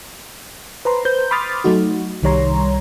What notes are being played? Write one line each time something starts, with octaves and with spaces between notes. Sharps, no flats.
B4 C5 A#5 C6
B4 C5 G6
B5 C6 D6 D#6 F6 A6
F#3 A3 D#4 F#4
C2 D#3 G3 C#5 A#5 C6